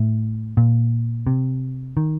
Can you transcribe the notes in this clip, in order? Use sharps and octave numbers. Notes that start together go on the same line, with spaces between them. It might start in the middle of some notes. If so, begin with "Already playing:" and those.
Already playing: A2
A#2
C3
D#3